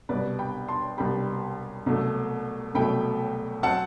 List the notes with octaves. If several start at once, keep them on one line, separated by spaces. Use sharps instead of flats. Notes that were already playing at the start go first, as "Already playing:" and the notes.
C2 B2 G3 B4 D5
G5 B5
A5 C6
C2 B2 G3 G5 B5
C2 B2 F#3 A3
C2 B2 F#3 A3 G5 B5
F#3 C4 F#5 A5